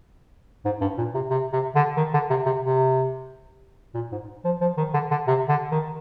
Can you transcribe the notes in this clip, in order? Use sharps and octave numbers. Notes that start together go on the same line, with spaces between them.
G#2
G2
A#2
C3
C3
C3
D3
D#3
D3
C3
C3
C3
A#2
G#2
F3
F3
D#3
D3
D3
C3
D3
D#3